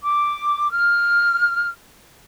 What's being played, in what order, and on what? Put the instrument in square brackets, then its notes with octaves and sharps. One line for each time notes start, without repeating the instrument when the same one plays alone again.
[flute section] D6
F6